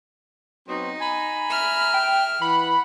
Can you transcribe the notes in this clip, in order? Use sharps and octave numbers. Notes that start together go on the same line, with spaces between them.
F#3 B3 C4 D#4
G#5 A#5 B5
E5 F6
G5
E3 F#5 B5